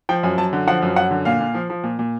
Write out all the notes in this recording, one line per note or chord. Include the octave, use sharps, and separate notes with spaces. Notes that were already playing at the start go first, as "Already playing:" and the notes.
F3 G5
F#2 G#5
F#2 A5
D3
F3 F#5
F#2
F#2 F#5
D3
A#2 F5
A#2
F3
F3
A#2
A#2